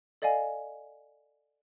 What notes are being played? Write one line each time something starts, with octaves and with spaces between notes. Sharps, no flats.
A4 D5 D#5 F5 G#5